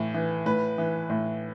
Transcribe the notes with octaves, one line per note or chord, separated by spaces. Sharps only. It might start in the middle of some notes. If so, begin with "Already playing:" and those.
Already playing: A2 E3
E3
A2 B4
E3
A2